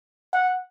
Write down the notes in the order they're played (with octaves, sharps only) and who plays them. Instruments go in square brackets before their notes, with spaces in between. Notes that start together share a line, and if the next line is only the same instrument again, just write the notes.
[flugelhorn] F#5